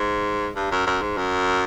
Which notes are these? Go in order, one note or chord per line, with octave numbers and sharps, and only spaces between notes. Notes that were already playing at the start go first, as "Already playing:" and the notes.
Already playing: G#2
G2
F#2
F#2
G#2
F#2